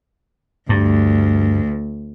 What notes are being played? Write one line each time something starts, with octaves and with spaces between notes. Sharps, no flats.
D2 G2